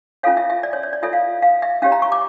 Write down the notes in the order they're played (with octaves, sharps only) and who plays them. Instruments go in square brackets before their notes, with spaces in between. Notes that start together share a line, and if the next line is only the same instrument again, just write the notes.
[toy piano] C#4 F4 A4 C#5 F5
E5
E5
D5
C#5
C#5
D5
F4 A4 C#5 E5
F5
F5
E5
C#4 G4 C#5 F5
A#5
C#6
D6